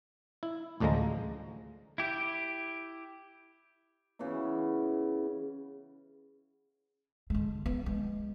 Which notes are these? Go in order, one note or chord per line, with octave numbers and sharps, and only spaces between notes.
E4
A1 D2 D3 F3 G#3 A#5
E4 G4
C#3 E3 B3 E4
D3 G#3
B3
G#3